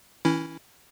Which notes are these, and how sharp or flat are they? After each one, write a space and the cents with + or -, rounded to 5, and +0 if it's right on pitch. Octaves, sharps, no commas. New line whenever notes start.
E3 -35 C#4 +0 E4 +0